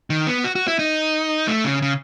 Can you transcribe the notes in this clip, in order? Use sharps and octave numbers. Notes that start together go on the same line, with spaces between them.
D#3
B3
F#4
F#4
E4
D#4
A3
C#3
C#3